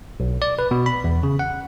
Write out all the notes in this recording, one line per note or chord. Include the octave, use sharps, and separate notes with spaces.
B1
D5
B4
B2
B5
E2
C#3
F#5